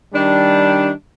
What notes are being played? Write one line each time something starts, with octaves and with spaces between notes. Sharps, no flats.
D#3 G3 D4